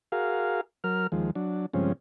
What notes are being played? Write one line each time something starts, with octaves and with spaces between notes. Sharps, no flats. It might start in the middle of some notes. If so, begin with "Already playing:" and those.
F#4 G#4 A#4 F5
F#3 A#4 F6
D#2 F3 G#3
F#3 D4
G2 C#3 F3 G#3 C4 C#4